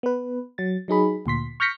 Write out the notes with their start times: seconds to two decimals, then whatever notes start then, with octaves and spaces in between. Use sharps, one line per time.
0.03 B3 B4
0.58 F#3 A6
0.88 F#3 D#4 G#4 B5
1.26 D2 A#2 C6 B6
1.60 C#6 F6 G6 A#6 B6 C#7